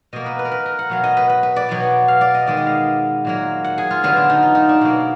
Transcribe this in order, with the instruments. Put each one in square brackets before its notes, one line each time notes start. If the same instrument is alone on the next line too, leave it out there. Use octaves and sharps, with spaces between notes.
[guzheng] B2 A#3 D#5
B4
B4
A#4
B4
A#4
F#5
B2 F#3 B3 F5
D#5
B4
B4
B4
D5
B2 F#3 B3
F5
D5
D#5
D#3 G#3 B3 D5
D#5
F5
A#2 F#3 A#3
F#5
G#4
F4
D3 F#3 B3 F4
D4
D#4
F4
D#4
D4
B2 F#3 A#3